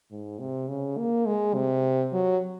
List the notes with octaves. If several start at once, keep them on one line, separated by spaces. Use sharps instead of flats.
G#2
C3
C#3
A#3
G#3
C3
F#3